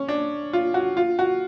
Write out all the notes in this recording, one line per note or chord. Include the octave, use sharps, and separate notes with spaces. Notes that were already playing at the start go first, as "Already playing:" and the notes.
Already playing: C#4
D4
F4
F#4
F4
F#4